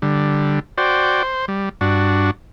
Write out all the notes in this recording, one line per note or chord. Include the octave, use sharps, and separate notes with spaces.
D3 G3
F#4 C5 D5 G5
C5
G3
G2 D4 F#4